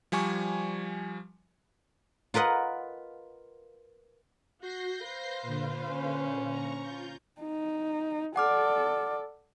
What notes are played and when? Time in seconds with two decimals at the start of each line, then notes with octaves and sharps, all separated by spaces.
0.12 F3 G3 G#5 C#6
2.34 F4 A#4 B4 D#5 F#5
4.61 F#4 G6 A#6 C7
5.02 B4 C5 F5
5.42 A#2 D3
5.88 C#4
6.49 A#5 C#6
6.82 F4 G6
7.40 D#4
8.36 A4 D5 F#5 D6 F6